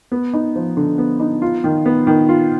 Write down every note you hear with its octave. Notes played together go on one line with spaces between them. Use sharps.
B3
D#4
F3
D3
B3
D#4
F4
D#3
B3
D#3
F4